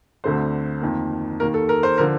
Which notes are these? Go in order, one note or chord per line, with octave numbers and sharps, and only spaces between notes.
D2 D3 A3 C4 C5
F2 D#3 A#3
D#2 D#3 A#3 A#4
A4
A#4
C5
D3 F3 A#4